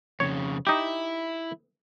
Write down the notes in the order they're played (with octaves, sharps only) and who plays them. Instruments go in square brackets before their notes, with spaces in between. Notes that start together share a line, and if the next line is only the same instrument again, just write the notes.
[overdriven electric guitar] F2 C#3 [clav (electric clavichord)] C#5
[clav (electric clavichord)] D#4 G4 [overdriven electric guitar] E4